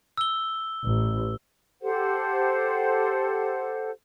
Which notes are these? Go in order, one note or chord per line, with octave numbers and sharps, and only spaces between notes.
E6 G7
A1
G4 A4 C5 F#5